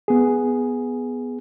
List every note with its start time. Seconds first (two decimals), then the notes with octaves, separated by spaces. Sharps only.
0.08 B3 G#4